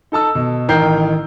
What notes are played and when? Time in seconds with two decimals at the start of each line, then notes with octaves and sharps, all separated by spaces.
0.12 D#4 A4 A5 E6
0.35 B2
0.68 A1 D#3 A#4 G5 G6 C7